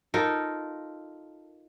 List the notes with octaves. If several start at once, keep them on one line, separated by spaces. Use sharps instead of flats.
D#4 F4 A4 A#4